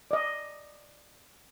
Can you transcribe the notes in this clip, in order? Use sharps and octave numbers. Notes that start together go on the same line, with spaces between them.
D5 D#5